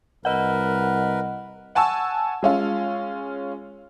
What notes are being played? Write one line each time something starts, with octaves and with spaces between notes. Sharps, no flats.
C2 A#4 B4 D#5 F#5
F#5 G#5 A5 C#6 E6
G#3 C#4 F4